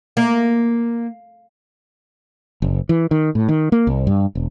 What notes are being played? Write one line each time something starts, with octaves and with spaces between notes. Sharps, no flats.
A#3
F#1
E3
D#3
A2
D#3
A#3
C2
G2
E1